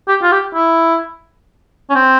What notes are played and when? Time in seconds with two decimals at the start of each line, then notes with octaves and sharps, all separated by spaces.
0.08 G4
0.23 F4
0.32 G4
0.55 E4
1.90 C#4
1.95 C4